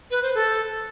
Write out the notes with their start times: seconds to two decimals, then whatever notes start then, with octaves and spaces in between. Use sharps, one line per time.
0.11 B4
0.23 C5
0.35 A4